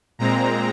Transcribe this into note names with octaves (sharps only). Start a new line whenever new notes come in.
A#2 G#3 C4 A#5